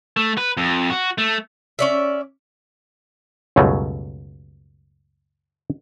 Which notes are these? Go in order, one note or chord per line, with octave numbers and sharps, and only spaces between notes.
A3
B4
F2
F#4
A3
C#4 D5 E5
C#2 F#2 B2 F#3 G3 A3